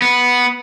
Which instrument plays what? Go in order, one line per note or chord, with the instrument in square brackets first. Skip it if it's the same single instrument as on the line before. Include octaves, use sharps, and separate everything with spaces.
[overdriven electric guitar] B3